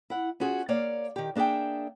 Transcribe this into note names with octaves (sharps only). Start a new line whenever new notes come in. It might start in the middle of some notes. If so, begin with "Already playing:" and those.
E4 F#5
C#4 F4 F#4 G#4
A#3 C#5 D5 F5
D#3 G4
A#3 D4 G#4 E5 G5